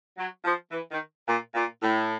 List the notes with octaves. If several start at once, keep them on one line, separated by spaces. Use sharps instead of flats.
F#3
F3
E3
D#3
A#2
A#2
A2